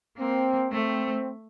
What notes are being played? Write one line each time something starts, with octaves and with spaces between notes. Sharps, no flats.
A#3 C4
A3 C4